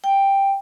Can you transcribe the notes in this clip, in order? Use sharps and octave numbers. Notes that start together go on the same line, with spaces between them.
G5